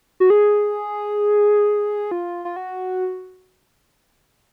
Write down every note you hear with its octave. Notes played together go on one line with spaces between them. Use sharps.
F#4
G#4
F4
F4
F#4